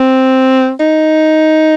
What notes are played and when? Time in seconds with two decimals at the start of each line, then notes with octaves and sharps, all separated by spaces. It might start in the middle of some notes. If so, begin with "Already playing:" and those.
Already playing: C4
0.80 D#4